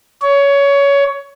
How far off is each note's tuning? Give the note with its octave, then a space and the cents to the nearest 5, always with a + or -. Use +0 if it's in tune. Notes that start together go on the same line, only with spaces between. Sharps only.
C#5 +20